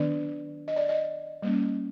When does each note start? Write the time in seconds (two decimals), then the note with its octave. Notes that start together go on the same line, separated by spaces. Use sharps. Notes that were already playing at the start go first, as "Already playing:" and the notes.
Already playing: D#3 F#3 B3 D4 D5
0.68 D#5
0.76 D5
0.89 D#5
1.42 G3 A#3 C#4